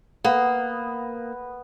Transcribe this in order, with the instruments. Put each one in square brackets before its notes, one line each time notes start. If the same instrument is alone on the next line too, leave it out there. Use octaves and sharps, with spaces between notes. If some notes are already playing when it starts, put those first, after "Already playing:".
[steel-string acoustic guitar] A#3 [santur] B3